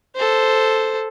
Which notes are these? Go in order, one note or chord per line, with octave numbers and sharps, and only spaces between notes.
A4 C5